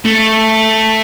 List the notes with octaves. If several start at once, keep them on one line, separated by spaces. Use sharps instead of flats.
A3